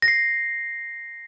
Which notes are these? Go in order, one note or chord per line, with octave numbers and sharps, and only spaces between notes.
A#6
C7